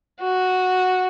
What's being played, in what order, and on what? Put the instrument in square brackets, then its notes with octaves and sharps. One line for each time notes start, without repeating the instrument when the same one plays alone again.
[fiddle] F#4